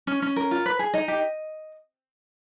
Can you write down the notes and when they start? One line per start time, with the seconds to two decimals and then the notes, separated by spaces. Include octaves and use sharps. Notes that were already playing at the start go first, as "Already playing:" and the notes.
0.07 C#4
0.22 C#4
0.36 A#4
0.51 F4
0.66 B4
0.79 G#4
0.94 D#4 D#5
1.08 G4